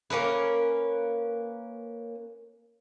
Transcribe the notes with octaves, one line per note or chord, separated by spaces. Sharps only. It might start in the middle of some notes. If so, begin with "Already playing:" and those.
A#3 C#4 A#4 B4